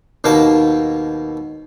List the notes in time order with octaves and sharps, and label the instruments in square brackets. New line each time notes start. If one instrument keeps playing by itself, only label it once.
[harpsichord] D#2 B2 A#3 A#4 A5